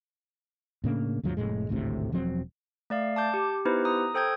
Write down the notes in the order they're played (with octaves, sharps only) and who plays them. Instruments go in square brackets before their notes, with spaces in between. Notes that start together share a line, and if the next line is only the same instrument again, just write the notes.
[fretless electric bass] A2 C#3 A#3 D4
D2 G2 F3 F#3
F1 F#2 A2 G#3
G#1 D2 A2 C3
E1 F3 F#3 C4
[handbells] A3 D5 F5
A5 D6 G6
G4
B3 D#4 E4 G4 B4 C5
A#5 D#6
A4 C5 G5 D#6 G6 G#6